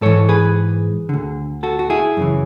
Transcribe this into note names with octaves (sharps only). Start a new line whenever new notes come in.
G#2 E3 A4 C#5
G#4 B4
D2 D3
F#4 A4
F#4
E4 G#4
F#2 C#3 E3